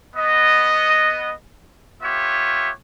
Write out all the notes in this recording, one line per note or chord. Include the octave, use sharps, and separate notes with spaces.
B3 D#5
B3 F4 G4 C#5 E5